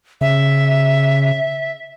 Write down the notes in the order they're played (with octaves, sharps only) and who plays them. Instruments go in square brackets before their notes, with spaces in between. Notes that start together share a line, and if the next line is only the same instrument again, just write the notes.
[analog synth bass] C#3 [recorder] E5